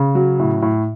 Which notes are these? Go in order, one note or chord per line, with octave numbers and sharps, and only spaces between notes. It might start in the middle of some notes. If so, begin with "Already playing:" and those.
Already playing: C#3
F#3
A2
A2